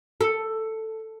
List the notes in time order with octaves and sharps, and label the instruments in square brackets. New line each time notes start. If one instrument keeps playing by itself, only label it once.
[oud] A4